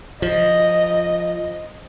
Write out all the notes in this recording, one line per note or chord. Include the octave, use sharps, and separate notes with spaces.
F3 D#5